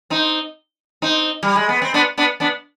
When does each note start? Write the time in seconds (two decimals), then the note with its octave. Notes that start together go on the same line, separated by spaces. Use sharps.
0.10 C4 D#4
1.02 C4 D#4
1.43 G3
1.56 G#3
1.69 B3
1.82 C4
1.94 B3 D4
2.18 B3 D4
2.40 B3 D4